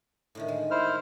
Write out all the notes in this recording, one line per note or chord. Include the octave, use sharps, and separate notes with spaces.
A2 D3 D#3
G#3
E4 C5 F6